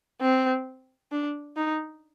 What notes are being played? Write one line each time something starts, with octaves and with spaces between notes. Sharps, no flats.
C4
D4
D#4